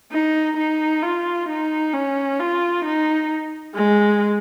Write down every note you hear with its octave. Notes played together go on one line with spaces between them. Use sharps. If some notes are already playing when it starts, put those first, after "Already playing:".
D#4
D#4
F4
D#4
C#4
F4
D#4
G#3